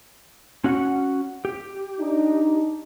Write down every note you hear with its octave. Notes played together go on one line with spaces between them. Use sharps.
C#4 F#4 F#5
G4
D4 D#4